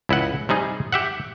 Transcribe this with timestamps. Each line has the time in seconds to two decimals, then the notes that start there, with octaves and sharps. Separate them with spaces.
0.09 C#2 E4 D#5 F#5
0.49 C3 G3 D#4 G#4
0.93 G4 E5 F#5